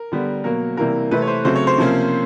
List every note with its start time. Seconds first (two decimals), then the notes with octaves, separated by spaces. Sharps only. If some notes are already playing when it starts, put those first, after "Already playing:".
Already playing: A#4
0.12 D3 G3 B3
0.44 B2 F#3 A#3 A#4
0.77 C3 E3 G3 A#3 A#4
1.11 C3 E3 A3 C4 B4
1.22 C#5
1.27 C5
1.45 C#3 F#3 A3 C4 C5
1.56 C#5
1.67 C5
1.78 C3 F3 A#3 C#4